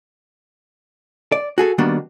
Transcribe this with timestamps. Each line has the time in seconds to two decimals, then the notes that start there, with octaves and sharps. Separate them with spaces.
1.32 D5
1.58 F#4 G#4 A4
1.78 D#3 G3 A#3 B3 D4 F#4